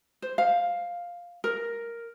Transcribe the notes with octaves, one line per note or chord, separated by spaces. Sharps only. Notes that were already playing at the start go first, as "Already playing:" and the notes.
C5
F5
A#4